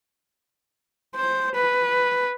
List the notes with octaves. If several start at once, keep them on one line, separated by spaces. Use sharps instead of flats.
C5
B4